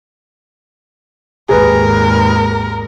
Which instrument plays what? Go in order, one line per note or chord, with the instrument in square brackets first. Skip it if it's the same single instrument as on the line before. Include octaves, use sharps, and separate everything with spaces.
[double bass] G#1 D#2 [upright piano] G#4 B4 [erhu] A#4